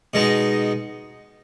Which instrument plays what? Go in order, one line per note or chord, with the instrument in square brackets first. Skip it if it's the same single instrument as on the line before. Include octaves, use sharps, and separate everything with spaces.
[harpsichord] B2 G#3 D#4